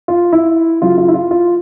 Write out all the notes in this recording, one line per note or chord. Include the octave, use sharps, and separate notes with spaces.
F4
E4
C#3 F#3 F4
F4
E4
F4
F4